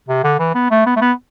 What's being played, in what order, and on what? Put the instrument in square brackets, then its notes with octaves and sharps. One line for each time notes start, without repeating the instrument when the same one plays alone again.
[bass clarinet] C3
D3
E3
B3
A3
B3
A3
B3